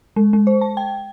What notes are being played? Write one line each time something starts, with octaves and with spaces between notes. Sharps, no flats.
G#3
G#3
C5
A5
G5